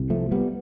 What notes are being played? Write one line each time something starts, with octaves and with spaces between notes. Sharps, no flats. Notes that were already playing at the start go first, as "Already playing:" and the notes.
Already playing: C2 C3
F3 A3
G3 B3